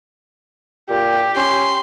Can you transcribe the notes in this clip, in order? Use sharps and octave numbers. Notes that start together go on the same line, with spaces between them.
A#2 G4
C#4 C6